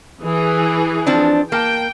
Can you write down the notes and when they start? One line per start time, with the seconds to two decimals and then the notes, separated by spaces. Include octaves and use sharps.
0.23 E3 G#4
1.07 F3 C4 D4
1.52 A#3 G5 A5